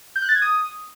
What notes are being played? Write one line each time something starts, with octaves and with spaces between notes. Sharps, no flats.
G6
F#6
A6
G#6
D#6